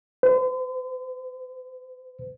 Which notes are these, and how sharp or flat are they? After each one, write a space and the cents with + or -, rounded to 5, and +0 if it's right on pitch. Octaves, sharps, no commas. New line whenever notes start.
C5 -45